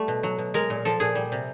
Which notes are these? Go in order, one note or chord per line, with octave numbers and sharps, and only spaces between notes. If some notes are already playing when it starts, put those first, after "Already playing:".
Already playing: G3 A3
B2
F#3
B2
G#3 A#4
A#2
F3 A4
A#2 G#4
G3
C3